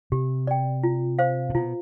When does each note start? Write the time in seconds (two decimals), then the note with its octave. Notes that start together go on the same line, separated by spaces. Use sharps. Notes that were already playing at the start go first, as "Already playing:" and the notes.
0.12 C3 G4
0.47 D5 G5
0.84 F4
1.19 C5 F5
1.49 A2
1.55 B2 F4